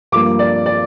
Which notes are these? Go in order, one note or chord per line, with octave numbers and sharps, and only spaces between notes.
G2 F3 A#3 D6
D5
D5